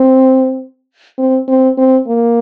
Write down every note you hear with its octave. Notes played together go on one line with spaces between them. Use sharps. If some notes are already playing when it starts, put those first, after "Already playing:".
Already playing: C4
C4
C4
C4
A#3